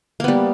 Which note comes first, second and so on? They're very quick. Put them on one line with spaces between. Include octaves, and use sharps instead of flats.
A#3 B3 G3